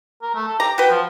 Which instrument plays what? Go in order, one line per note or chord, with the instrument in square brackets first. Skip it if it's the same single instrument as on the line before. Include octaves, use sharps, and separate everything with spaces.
[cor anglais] A#4
A3
A4
[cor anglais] G4 [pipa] A#5
[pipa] F#4 B4 [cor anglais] G5
[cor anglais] F3